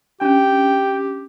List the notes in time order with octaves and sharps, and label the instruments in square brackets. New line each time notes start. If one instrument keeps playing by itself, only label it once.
[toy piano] C#4 D4 [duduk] G4 [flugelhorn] G5